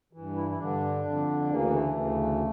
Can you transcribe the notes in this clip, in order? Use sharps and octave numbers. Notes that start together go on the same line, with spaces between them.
G2 E3
E4
E4
G2 D3 D4
F2 D3
D2 C#3 E3 A#3
A3
D2 C#3 E3